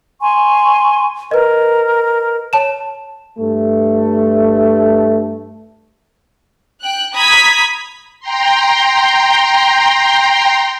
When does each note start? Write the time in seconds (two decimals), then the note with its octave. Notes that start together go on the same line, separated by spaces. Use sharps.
0.21 G#5 C6 C#6
1.31 A#4 B4 D#5
2.53 C#5 A5 E7
3.38 G2 A3
6.82 G5 F#6
7.14 A#5 B5 D#6 G#6 B6
8.20 G5 A#5 C6